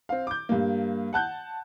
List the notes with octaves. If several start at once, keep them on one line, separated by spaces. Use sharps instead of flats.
C4 F5
D6 G6
G2 A#3
F#5 A5 F#6 G6